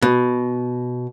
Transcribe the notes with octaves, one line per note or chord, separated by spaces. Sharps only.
B2